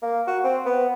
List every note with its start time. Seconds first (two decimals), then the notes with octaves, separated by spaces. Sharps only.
0.02 A#3
0.27 F#4
0.44 C4
0.66 B3